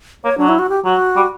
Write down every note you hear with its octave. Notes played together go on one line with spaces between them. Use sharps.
A#3 C#5
F#3 D4
E4
F#4
G4
F#3 F#4
G3